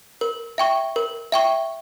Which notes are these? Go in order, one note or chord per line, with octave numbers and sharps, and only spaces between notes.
A#4
E5 G5 C#6
A#4
E5 G5 C#6